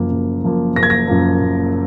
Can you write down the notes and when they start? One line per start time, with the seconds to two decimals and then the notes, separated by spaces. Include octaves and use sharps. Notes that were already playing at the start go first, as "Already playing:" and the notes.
Already playing: F#1 F#2 F3 A#3
0.12 F#1
0.44 F#2 F3 A#3
0.76 F#1 A#6
0.83 G#6
0.90 A#6
1.08 F#2 F3 A#3
1.41 F#1